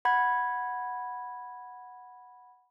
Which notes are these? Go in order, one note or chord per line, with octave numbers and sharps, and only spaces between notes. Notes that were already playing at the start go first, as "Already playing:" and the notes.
F#5 B5 G#6